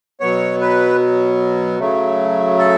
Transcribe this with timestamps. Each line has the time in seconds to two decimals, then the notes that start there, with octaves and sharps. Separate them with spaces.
0.20 B2 F#3 B3 C#5
0.61 B4
1.79 C#3 F#3 A3
2.58 A4